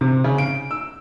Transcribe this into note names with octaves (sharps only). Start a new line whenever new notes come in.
C3
C#3
D7
E6